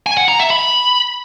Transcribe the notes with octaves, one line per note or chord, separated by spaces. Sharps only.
G#5
F#5
A#5
E5
B5